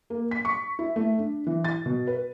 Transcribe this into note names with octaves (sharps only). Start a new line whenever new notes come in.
A#3
B6
C#6
E4
A3
D4
E3
A6
B2
B4